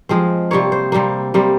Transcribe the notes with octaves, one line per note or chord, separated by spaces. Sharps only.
F3 G#3 C4
C3 G3 A#3 C#5
C5
C3 G3 A#3
C3 G3 A#3